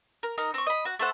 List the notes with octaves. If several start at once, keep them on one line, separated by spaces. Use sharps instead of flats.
A#4
D#4 A#4 A#5
C4 C#6
D#5 B5
F#4 F#5
A3 A4 C5 F#5